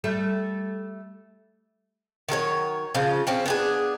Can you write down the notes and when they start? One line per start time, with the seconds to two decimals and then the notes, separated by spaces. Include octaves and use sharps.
0.04 G3 A3 A4
2.29 D#3 F#3 A4 C#5
2.95 C#3 F3
3.27 F3 C4 C#4
3.46 B3 D4 G#4